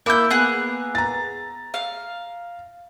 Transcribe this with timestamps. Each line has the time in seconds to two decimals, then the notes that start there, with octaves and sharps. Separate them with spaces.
0.06 A#3 E4 D6 E6 G6
0.30 B3 G#4 F#6
0.95 A#5 A6
1.74 F5